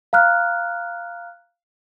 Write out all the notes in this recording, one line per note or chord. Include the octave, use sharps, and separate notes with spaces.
F5 A#5 F6 F#6